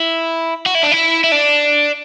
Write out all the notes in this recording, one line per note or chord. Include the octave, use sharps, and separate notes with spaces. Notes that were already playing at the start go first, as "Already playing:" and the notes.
Already playing: E4
F#4
E4
D4
E4
E4
D4